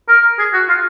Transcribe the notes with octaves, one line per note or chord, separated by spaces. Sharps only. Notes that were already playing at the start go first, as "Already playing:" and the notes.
A#4
G#4
F#4
F4